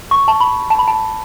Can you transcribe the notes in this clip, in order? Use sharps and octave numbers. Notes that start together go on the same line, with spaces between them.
C#6
A5
B5
A5
B5
A5